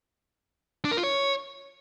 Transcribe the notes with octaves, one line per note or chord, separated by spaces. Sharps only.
D4
A#4
F4
C#5